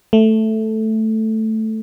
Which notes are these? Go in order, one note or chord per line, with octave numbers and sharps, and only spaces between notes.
A3